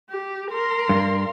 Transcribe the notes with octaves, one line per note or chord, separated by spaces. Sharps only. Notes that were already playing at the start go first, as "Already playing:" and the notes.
G4
A#4 C6
G2